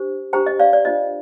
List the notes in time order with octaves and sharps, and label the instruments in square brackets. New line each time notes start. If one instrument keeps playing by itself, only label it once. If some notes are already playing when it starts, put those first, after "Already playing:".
Already playing: [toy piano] D4 G4 C5
D4 G4 C5 G5 A#5
D#5
D5 F5
D5
D4 F4 C5 D#5